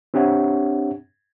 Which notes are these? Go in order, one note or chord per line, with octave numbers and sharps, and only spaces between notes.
C4 D4 G4 C#5 E5 F#5